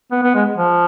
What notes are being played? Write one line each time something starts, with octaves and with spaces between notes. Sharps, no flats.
B3
B3
G#3
F3